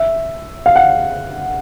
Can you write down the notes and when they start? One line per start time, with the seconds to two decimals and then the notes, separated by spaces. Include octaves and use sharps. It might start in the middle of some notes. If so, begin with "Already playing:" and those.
Already playing: E5
0.66 F5
0.76 F#5